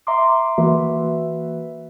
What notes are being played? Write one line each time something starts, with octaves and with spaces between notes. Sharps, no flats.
E5 A#5 C6 D6
E3 A#3 F#4 B4 E5